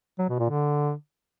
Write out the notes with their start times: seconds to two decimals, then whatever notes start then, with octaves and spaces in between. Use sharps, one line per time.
0.19 F#3
0.29 B2
0.39 A#2
0.49 D3